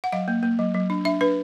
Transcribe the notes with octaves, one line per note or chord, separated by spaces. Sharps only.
F#5
F#3 F5
A#3
A#3
F#3
F#3
D4
D4 E5
D4 B4